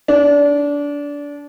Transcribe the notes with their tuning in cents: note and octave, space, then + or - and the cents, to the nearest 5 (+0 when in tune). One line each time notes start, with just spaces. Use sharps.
D4 -25